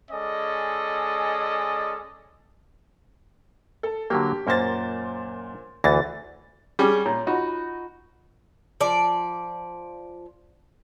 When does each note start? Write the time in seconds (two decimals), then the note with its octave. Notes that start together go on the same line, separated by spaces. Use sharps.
0.11 G#3 C#4 A4 D5 D#5
3.83 A4
4.10 D3 F#3 A#3 G4
4.47 F#2 A#2 A#3 C5 A6
5.84 D2 E3 A6
6.79 G3 C#4 G4 G#4
7.06 A#2 C#5 G6
7.27 D#4 F4 F#4 B5
8.81 F3 D5